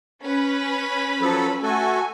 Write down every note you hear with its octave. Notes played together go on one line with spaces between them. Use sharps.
C#4 B4 B5
F3 F#3 A4
A3 F#4 A4 G#5